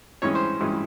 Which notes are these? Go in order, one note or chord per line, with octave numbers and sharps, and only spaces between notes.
G2 E3 G#3 C#4 C#5
C5
G2 E3 G#3 C#4